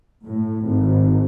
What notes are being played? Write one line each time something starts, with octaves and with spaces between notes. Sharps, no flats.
A2
G#1